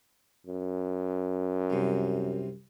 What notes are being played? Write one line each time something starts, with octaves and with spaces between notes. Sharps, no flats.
F#2
C2 C3